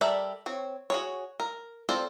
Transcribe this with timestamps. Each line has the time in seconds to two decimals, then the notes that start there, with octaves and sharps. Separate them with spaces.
0.01 G3 A4 A#4 D5 E5
0.46 C4 C#5
0.90 F#4 G#4 C#5
1.40 A#4
1.89 C4 F4 A4 C5 D5